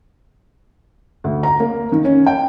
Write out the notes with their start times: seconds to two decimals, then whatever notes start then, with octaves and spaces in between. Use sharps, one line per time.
1.24 D2
1.43 A#5
1.60 A#3
1.92 D#3
2.04 C#4
2.26 G5